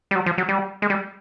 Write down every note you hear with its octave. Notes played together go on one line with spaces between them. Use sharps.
G3
F#3
F3
F#3
G3
G#3
G3